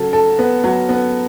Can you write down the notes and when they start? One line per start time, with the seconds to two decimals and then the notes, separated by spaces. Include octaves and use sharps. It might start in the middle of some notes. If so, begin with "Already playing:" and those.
Already playing: C#3 F#3 A4
0.13 A4
0.39 B3
0.64 F#3
0.89 B3